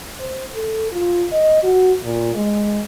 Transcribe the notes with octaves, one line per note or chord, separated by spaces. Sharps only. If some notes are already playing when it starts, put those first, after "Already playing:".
C5
A4
F4
D#5
F#4
A#2
G#3